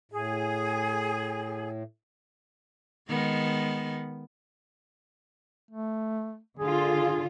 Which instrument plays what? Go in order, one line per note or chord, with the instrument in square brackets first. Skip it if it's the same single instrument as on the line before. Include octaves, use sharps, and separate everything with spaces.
[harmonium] A2 [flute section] G#4
[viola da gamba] D#3 G#3 B3
[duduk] A3
[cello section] D3 F4 [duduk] G#4